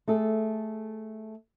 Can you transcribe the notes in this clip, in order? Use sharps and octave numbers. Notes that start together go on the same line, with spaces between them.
A3 G#4 A4